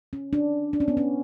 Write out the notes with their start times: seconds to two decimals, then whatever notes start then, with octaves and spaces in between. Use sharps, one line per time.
0.13 C#4
0.33 D4
0.73 D4
0.80 C#4
0.88 B3
0.97 C#4